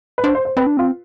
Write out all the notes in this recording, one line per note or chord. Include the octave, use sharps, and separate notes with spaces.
B4
D4 C5
C5
C5
C4 B4
D4
C4 F4